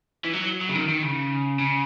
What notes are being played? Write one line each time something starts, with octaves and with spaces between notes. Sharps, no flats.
E3
F#3
F#3
C#3
D#3
D#3
C#3
C#3